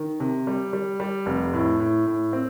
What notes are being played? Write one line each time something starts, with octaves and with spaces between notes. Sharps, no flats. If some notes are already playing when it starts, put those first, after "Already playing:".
Already playing: D#3
C3
G3
G3
G3
F1
A2
A2
A2
C4